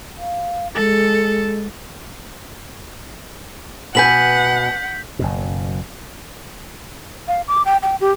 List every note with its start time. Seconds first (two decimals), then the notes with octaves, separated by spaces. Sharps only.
0.18 F5
0.75 G#3 A4
3.95 B2 B4 F#5 G#5 G6 B6 F#7
5.19 F#1 F#2 B2
7.28 F5
7.48 D6
7.65 G5
7.83 G5
8.01 G4